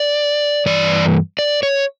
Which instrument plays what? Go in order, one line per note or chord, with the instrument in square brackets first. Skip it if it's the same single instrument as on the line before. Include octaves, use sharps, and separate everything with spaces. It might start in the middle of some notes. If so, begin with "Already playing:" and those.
Already playing: [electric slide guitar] D5
G2 E3 D5
D5
C#5